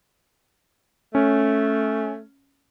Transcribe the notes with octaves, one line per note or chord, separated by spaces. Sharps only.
A3 C#4